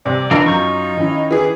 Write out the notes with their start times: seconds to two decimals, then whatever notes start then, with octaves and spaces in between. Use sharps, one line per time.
0.06 C2 C3 D5
0.31 E3 D4 D#4 F4 A#4
0.46 F#2 F#3 C#6 G6
0.97 D#3 C#4 E4
1.31 E3 G#4